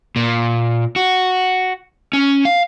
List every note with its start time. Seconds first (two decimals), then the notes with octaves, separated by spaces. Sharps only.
0.16 A#2
0.96 F#4
2.13 C#4
2.45 F5